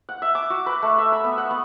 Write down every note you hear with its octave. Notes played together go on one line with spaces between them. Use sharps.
F#5
E5
D6
F#4
B4
A3
E5
B5
B3
F#5
B3